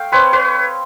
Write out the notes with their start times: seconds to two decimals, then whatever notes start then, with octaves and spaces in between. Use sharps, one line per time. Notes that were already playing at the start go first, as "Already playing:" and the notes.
Already playing: A3 F5 G5
0.12 C4 B4 C#5
0.33 B4 C#5